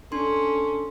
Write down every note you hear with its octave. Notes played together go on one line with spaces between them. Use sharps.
C#4 D4 A4 C6